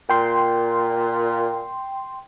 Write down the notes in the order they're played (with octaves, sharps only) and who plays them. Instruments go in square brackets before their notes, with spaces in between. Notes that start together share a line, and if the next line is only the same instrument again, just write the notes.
[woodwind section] A#2 [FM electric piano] G5 C6